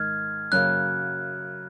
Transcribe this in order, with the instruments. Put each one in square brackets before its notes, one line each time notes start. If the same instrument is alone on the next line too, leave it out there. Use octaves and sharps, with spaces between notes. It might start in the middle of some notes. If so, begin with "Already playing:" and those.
Already playing: [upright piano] G#2 D#3 G#3 [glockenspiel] F6 G#6
[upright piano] F#2 C#3 F#3 A#3 [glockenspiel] F#6